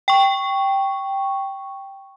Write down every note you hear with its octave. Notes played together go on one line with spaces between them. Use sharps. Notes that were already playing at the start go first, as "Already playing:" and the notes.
G5 C#6